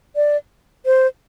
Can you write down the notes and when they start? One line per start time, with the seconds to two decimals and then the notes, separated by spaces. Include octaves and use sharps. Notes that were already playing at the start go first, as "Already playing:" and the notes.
0.16 D5
0.86 C5